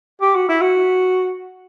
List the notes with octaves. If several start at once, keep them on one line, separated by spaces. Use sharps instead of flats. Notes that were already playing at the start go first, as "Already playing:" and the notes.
G4
F#4
E4
F#4